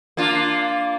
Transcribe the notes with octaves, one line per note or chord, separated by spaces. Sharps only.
A#3 D4 F4